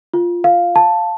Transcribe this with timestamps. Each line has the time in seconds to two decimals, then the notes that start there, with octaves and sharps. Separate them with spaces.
0.14 F4
0.44 F5
0.76 A5